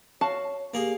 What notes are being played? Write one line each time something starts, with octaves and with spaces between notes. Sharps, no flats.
F#4 C#5 F5 A5
A#3 G4 G#4